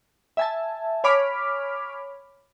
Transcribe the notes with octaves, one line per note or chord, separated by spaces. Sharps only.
E5 G#5 A5
C#5 G#5 B5 D6 F6